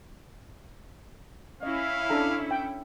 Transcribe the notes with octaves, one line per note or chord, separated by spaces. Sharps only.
C#4 E4 D#5 F5
D4 A4 A#5
G5